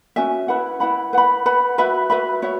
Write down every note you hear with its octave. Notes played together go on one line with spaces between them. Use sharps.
C#4 F#4 E5 G#5
E4 B4 F#5 B5
E4 B4 F#5 B5
B4 F#5 B5
B4 F#5 B5
F#4 B4 E5 B5
F#4 B4 E5 B5
F#4 C#5 E5